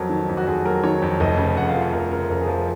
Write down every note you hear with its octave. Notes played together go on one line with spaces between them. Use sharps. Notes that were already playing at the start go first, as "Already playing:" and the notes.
Already playing: F2 F#3 A#4
D#3
F2
F#4
F2 G#4
F#3 A#4
D#3 C#5
F2
F1 D#5
C#3
F2 F#5
F5
F3
F5
F1 A#4
C#3 A#4
F2 A#4
G#4
F3
G#4